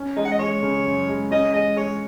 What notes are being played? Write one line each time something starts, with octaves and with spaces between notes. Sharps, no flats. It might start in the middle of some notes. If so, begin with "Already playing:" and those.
Already playing: C#4
G#3 D#4
F#5
D#5
G#3 C#5
C#3
F#2
G#3
C#4 D#5
G#3 D#5
G#3 C#5